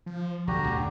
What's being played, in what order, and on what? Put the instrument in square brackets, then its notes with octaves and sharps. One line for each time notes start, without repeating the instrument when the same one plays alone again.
[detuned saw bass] F3
[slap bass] B1 [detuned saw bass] D3 [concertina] F#4 G4 A#5
[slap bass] A1 E2 A3